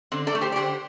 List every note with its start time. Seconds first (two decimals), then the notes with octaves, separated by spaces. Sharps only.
0.12 D3 C4
0.27 A4 D5
0.35 A3
0.41 G4 C5
0.52 D5
0.56 D3 G4 C5